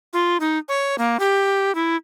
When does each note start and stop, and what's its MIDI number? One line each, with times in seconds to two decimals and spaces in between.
0.13 0.37 65
0.40 0.58 63
0.68 0.96 73
0.98 1.17 58
1.19 1.74 67
1.75 1.96 64